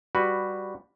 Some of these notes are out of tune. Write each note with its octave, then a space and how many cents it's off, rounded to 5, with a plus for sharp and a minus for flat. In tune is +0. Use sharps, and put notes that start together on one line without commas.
G3 +5 F#4 +0 B4 +0